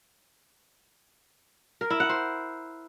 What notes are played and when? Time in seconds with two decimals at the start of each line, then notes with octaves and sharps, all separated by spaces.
1.81 A#4
1.90 E4
2.00 F#5
2.09 C5